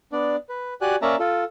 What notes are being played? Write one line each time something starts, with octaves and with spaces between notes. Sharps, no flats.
B3 D4 D5
B4
F#4 G4 D5 G#5 F#6
A#3 C#4 D5 E5 A5 A#5
F4 A4